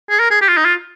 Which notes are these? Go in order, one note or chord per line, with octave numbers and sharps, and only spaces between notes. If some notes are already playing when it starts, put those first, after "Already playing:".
G#4
A#4
G#4
G4
F4
D#4
F4